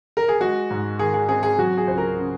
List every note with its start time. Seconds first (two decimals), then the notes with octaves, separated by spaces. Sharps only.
0.17 A#4
0.28 G#4
0.40 G#3 F#4
0.70 G#2
0.99 D#3 G#4
1.14 G#4
1.28 C4 G#4
1.43 G#4
1.58 F#3 F#4
1.77 G#4
1.87 C#2 C5
1.98 A#4
2.17 C#3